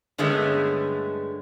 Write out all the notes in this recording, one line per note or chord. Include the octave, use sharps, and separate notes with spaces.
G2 D3 G#3 A3 B3 C#4